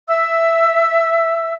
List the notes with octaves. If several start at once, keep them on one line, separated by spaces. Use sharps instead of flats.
E5 E6